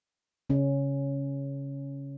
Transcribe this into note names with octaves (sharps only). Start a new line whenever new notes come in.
C#3 C#4